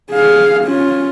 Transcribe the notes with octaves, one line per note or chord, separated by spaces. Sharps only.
G#4 F5
C#4 F4